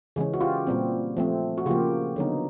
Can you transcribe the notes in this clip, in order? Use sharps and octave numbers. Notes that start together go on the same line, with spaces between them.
C#3 E3 G#3 C#4
F#4
F4 G4
A#2 G3 C4
F3 A3 C4
F#4
C#3 F3 A#3 F4 G4
D3 F#3 B3 D#4